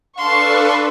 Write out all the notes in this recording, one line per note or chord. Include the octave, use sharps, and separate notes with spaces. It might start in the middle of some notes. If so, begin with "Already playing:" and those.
D4 A4 B4 F5 A5 C6 C#6